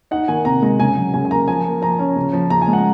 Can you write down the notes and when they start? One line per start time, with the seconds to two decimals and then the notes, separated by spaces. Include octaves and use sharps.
0.11 D#4 F#5
0.28 D#3 G#5
0.45 C3 A#5
0.62 G#3 A#5
0.79 C#3 G#5
0.96 F#3
1.14 C#3 G#5
1.25 G#5
1.31 A#3 A#5
1.48 F3 G#5
1.65 A#3
1.82 F3 A#5
1.99 C#4
2.16 C#3
2.33 F3
2.50 C#3 A#5
2.62 G#5
2.68 G#3
2.73 F#5